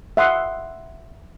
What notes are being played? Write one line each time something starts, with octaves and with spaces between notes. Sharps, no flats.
E5 F#5 C6 D#6